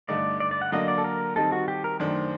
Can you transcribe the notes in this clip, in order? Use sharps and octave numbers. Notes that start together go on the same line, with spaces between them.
G2 D3 A3 D#4 D5
D5
D5
F#5
D3 F#3 A#3 D4 D#5
D5
A4
A#4
D#3 G3 C4 D#4 A4
F#4
G4
A#4
F#2 D#3 A3 D4 C5